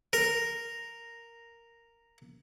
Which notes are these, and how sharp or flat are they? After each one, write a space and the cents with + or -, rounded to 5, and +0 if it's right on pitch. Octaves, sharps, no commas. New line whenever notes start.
A#4 -5